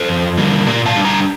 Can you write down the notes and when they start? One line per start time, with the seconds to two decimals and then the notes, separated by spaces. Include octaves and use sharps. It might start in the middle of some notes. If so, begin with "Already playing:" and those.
Already playing: A4 C5
0.09 F2
0.37 D3 G3 A#3
0.67 A#2 A#4 D5
0.86 F5 A5
0.96 G3 D4
1.05 G5 A#5